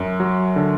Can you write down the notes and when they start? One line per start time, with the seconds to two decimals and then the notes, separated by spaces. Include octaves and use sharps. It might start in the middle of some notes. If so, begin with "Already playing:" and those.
Already playing: F#2
0.20 F#3
0.56 D3